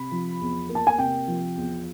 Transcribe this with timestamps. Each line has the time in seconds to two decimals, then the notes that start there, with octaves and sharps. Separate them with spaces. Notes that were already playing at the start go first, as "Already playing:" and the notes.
Already playing: C3 B5
0.12 F3
0.41 E2
0.69 A#3
0.75 A5
0.87 G#5
0.98 C3 G5
1.28 F3
1.57 E2